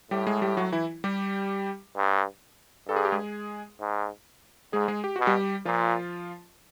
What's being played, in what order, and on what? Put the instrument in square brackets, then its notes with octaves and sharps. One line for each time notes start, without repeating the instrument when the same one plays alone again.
[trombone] A2 [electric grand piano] G3 G4
[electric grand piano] G#3 G#4
G3 G4
F#3 F#4
E3 E4
G3 G4
[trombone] G2
[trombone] G2 [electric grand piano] A4
[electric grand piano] G#4
G4
G#3 G#4
[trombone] G#2
[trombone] G#2 [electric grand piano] G#3 G#4
[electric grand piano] G#3 G#4
G4
[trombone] B2 [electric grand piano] F#4
[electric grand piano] G3 G4
[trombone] A#2 [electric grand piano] F3 F4